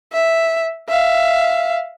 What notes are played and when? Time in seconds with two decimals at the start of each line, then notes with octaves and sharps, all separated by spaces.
0.13 E5
0.89 E5 F5